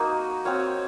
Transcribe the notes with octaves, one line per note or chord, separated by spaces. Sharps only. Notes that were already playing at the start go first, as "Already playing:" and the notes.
Already playing: A#3 D#4 F#4
C4 F#4 C#5 F5